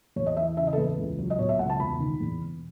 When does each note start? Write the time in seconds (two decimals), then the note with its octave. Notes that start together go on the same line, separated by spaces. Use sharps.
0.16 E2 C#5
0.26 D#5
0.37 E3 E5
0.57 C#3 E5
0.67 D#5
0.73 A4
0.77 E2 B4
0.97 C#2
1.18 F#3
1.30 D#5
1.38 B2 C#5
1.49 E5
1.59 C#2 F#5
1.69 A5
1.79 E1 B5
2.00 D#3
2.20 E2
2.41 E1